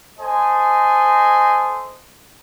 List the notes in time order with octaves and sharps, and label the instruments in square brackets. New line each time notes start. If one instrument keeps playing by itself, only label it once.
[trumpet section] A4 C5 D#5 G#5